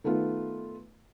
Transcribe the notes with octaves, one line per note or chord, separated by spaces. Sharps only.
D#3 A3 B3 F4